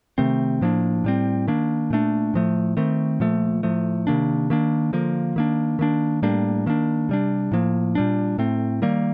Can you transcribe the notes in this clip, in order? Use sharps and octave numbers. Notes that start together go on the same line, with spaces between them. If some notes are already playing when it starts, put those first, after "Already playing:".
C3 D#3 A3 C4
A2 F3 A#3 D4
A2 G3 C4
D#3 A#3 D4
A#2 A3 D4
A2 F3 A3
D#3 A3 C4
A#2 F3 A3
A2 F3 A3
C3 D#3 A#3 D4
D#3 A#3 D4
D3 F3 A#3
D#3 A#3 D4
D#3 A#3 D4
A2 G3 A#3 D4
D#3 A#3 D4
C3 G3 D4
A2 F3 A#3
A#2 G3 D4
A2 A3 C4
D#3 G3 A#3